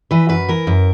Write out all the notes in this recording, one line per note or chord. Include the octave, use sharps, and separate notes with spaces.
E3 B4
F#2 B4
E3 A#4
F#2